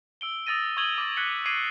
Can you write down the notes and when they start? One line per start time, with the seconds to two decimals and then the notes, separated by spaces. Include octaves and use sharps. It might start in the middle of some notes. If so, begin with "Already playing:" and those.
0.21 E6 D7 G7
0.46 D#6 E6 A6 A#6 D#7
0.77 C#6 D#6 E6 G#6 F#7 G7
0.98 D6 A6
1.17 F#6 G#6 B6 C#7 G7
1.46 D6 G#6 C7 D7 D#7 F#7